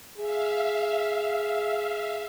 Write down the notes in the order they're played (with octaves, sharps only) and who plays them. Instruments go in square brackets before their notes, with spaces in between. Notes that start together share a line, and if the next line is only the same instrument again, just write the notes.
[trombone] G#4 [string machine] E5 F5